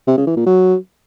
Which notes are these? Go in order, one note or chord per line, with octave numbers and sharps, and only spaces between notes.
C3
C#3
E3
A#2
F#3